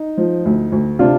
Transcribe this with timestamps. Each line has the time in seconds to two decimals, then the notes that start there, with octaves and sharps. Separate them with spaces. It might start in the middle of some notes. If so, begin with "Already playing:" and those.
Already playing: D#4
0.17 F3
0.45 D2
0.72 D2
0.99 C3 D4 F4